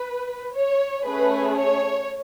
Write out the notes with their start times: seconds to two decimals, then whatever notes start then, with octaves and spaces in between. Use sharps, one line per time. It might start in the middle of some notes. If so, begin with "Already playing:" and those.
Already playing: B4
0.54 C#5
1.06 A3 C#4 G#4 B4
1.58 C#5